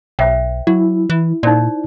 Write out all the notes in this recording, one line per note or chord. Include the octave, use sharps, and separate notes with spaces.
B1 C5 E5 G5
F#3 E4
E3
A#2 D#4 C5 D5